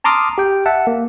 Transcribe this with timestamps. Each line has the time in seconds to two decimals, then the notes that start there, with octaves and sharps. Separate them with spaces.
0.04 A5 A#5 C6 D6 D#6 F6
0.38 G4 G5
0.66 E5 F#5 A5
0.87 A#3